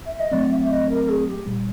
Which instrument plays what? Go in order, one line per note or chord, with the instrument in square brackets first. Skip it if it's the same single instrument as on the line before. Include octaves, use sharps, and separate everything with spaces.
[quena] E5
D#5
[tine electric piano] F#3 A3 C4 [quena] D5
[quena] E5
D#5
A#4
G#4
G4
[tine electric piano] A#2 G3